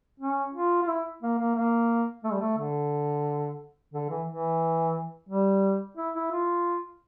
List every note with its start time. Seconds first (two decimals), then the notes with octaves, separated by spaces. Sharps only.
0.20 C#4
0.54 F4
0.83 F4
0.88 E4
1.22 A#3
1.38 A#3
1.56 A#3
2.24 A3
2.32 G3
2.41 A3
2.57 D3
3.94 D3
4.10 E3
4.27 E3
5.29 G3
5.97 E4
6.15 E4
6.31 F4